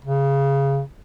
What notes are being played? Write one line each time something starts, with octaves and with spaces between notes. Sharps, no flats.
C#3